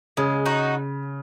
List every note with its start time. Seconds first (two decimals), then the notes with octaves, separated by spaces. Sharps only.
0.17 C#3 G#3
0.46 D#4 F#4